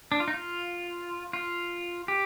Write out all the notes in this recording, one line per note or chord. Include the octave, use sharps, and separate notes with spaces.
D4
F4
D#4
F4
F4
G4